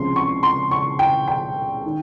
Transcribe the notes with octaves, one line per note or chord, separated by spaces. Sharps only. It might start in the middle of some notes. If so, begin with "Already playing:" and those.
Already playing: C#2 C3 F3 G#3 C#4 C6
C#6
C6
C#6
G5
G5
D#3